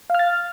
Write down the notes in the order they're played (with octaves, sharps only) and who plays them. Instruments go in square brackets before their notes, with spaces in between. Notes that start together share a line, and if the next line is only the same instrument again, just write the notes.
[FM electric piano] F5
F6
A6